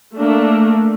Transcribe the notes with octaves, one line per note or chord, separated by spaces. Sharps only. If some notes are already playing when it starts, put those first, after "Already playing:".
A3 A#3 D4